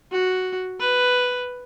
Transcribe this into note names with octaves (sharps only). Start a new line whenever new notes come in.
F#4
B4